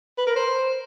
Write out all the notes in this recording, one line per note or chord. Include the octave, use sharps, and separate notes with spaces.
B4
A#4
C5